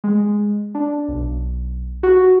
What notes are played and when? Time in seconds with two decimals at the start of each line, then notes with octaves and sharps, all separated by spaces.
0.04 G#3
0.75 D4
1.08 B1
2.03 F#4